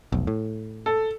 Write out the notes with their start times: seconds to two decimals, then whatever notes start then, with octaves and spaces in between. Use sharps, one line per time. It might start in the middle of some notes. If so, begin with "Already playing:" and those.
0.12 F1 B1
0.27 A2
0.86 A4